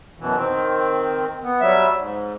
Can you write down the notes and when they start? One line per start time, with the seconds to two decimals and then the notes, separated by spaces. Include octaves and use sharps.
0.19 F#2 B2 E3
0.36 D#3 C4
1.43 B3
1.61 F#3 G3 E5
1.98 G#2